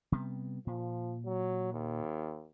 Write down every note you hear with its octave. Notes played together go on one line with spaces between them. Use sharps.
C3 G3 B3
A#2 F3
F#3
D#2